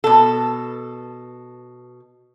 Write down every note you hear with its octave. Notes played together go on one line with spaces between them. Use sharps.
B2 A4